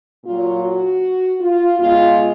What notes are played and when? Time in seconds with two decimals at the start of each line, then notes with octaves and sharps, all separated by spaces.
0.24 A#2 F#3 F4
0.63 F#4
1.41 F4
1.79 B2 G#3 F4